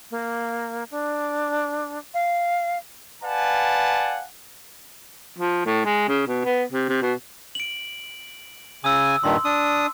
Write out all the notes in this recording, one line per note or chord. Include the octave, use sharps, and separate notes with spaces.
A#3
D4
F5
B4 D5 F5 F#5 G#5 A5
F3
A2
G#3
C#3
B2
B3
C3
C3
B2
D7 F#7
C#3 G#5 D#6 E6
G2 A#2 D#3 C6
D4 D#6